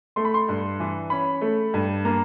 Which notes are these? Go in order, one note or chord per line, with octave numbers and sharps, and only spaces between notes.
A3 C6
B5
C6
G2
E3
C#4 B5
A3
G2
A#3 A#5